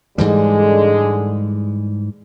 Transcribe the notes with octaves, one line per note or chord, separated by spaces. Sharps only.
G#2 D3 E3 G3 G#3